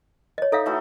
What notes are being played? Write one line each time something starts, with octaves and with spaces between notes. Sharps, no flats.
C#5 D#5
D#4 A4 E5 F5
E3 A3 F#4